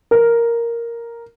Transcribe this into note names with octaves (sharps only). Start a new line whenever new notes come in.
A#4